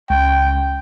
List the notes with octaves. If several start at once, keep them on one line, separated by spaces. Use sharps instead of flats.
C#2 G5